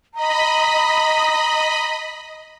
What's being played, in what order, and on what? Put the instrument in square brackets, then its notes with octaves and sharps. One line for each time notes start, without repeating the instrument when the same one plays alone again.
[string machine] D#5 B5 [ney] A#5